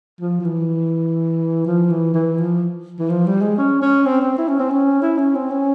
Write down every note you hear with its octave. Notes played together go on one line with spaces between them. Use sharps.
F3
F3
E3
F3
E3
E3
F3
E3
F3
G3
G#3
C#4
C#4
C4
C4
E4
C#4
C4
C#4
E4
C#4
C4
C#4